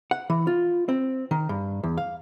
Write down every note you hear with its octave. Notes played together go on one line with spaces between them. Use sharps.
F#5
E3
F4
C4
D#3
G2
E2
F5